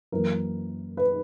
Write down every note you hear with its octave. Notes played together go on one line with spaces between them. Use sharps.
F#2 E3 A#3 A#4
B4